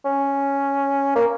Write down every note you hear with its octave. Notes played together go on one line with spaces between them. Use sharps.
C#4
A#3